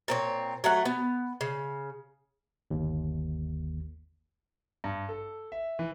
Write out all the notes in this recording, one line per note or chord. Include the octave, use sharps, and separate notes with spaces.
A#2 C4 C#5
F#3 A3 F#5
B3
C#3
G1 D#2
G2
A4
E5
E3